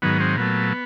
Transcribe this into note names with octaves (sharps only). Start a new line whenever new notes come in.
G#2 D#3 F#3 B3
C4
A#2 F#3 A3 B3